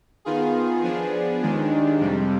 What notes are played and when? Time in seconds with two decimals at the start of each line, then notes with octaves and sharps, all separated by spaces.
0.25 D#3 B3 F4 G#4
0.83 F3 B3 D4 G#4
1.43 D#2 D#3 G#3 D4
2.00 F2 C3 G3